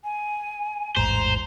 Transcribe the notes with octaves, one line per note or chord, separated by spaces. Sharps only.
G#5
A1 E2 G#2 C5 A#5